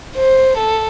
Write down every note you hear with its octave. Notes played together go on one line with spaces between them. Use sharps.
C5
A4